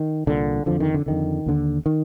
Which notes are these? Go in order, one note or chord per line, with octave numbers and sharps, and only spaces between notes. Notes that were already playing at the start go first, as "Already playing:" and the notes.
Already playing: D#3
C2 A#2 D3
F2 D3 F3
D#3
D3
F2 D3 D#3
D#2 D3
D#3